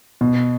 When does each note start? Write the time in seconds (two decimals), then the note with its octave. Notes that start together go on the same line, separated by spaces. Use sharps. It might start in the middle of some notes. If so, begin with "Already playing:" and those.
0.21 B2